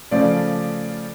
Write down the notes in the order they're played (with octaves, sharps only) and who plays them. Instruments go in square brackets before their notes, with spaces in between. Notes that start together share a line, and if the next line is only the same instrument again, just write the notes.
[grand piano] C#3 F3 A3 D5